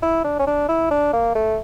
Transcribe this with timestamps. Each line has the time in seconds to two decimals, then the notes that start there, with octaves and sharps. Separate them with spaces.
0.02 E4
0.24 D4
0.39 C#4
0.47 D4
0.68 E4
0.91 D4
1.13 A#3
1.35 A3